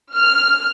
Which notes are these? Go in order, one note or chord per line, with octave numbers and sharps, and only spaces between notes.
F6